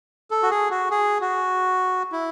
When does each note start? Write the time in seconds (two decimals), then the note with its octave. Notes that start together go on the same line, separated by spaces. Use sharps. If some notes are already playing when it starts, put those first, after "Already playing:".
0.31 A4
0.43 F#4
0.50 G#4
0.70 F#4
0.91 G#4
1.21 F#4
2.12 E4